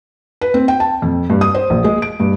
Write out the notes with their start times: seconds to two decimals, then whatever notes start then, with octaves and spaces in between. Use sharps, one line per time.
0.41 B4
0.54 C4
0.68 G5
0.80 A5
1.02 F2
1.30 G2
1.41 D#6
1.55 C5
1.70 A#1
1.84 G#3
2.02 D7
2.20 G2